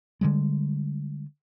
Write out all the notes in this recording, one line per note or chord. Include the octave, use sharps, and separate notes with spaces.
D3 G3 G#3